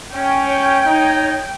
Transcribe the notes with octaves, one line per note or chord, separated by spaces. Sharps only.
C#4 G5
C#5
D#4